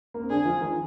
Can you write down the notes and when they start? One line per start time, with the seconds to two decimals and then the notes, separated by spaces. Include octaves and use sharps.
0.14 A#3
0.22 C4
0.30 D3 D4 G#4
0.45 F3 F4
0.61 D#3 D#4